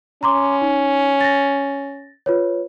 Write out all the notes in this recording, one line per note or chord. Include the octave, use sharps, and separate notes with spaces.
C#4 A#5 C6 D6
D#4
A6 A#6
F4 B4 C#5